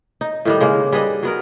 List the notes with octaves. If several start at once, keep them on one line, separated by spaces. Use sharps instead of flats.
D#4
A2 D#3 G3
C#3 G#3 A#3
G3 G#4 B4 D#5
F#3 B3 A#4